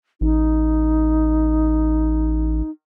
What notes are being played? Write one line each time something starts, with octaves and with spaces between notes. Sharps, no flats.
A1 D#4